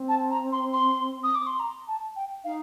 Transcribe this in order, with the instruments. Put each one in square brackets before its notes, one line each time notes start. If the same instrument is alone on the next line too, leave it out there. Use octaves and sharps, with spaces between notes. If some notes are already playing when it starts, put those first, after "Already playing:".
Already playing: [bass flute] C4
[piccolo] A5
A#5
C6
C6
D#6
D6
C6
A#5
A5
G5
[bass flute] D#4 [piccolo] F5